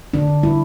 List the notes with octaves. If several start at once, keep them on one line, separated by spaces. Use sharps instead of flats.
D3 D4
D3
G3 E4